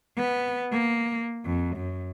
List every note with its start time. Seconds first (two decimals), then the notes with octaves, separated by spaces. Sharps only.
0.16 B3
0.73 A#3
1.46 F2
1.77 F#2